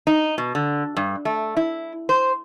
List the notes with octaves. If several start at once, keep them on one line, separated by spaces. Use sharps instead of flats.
D#4
B2
D3
G2
A3
E4
C5